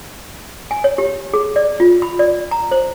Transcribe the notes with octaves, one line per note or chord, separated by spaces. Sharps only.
G#5
C#5
G4
G#4
D5
F4
B5
D5
A#5
C5